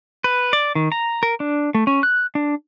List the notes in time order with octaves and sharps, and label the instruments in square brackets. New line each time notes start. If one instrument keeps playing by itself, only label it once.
[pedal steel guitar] B4
D5
D#3
A#5
A#4
D4
A3
C#4
F#6
D4